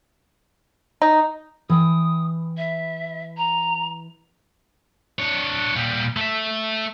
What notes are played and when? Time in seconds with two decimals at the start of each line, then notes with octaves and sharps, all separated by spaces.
1.02 D#4
1.70 E3 G5 D#6
2.57 E5
3.37 A#5
5.19 D4 C#5
5.76 A#2 G3
6.17 A3 E5